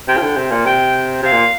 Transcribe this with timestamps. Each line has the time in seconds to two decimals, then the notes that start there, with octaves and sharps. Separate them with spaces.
0.08 C3 G5
0.17 F3
0.23 D3
0.37 C3
0.52 A#2
0.66 C3 G5
1.23 C3 F5
1.33 A#2